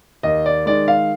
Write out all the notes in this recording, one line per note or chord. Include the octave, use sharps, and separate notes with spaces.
D#2 D#5
D5
D#3 G#3 D5
F5